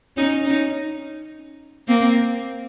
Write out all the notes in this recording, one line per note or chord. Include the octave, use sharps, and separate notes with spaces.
C#4 D#4
C#4 D#4
A#3 C4